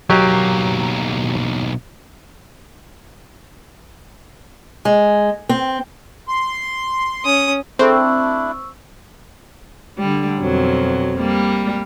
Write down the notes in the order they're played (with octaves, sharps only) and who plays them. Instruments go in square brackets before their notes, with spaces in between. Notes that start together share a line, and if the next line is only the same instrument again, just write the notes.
[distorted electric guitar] B1 A#3 [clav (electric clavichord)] F#3 G4 D#5
[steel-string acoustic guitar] G#3
C4
[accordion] C6
[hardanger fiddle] C#4 D#6
[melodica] A3 D4 E4 [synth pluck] C4 [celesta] G#4 A4 C#6
[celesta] C#6 E6
[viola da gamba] D3 G3
F2 B2 F#3
G3 A#3